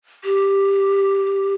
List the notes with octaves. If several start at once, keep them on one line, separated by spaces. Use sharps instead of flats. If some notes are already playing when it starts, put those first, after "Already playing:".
G4